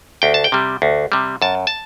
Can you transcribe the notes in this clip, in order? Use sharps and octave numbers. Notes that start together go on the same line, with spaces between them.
D2 G5
A5
G5
C3 G3
D2
C3 G3
F#2 A5
A5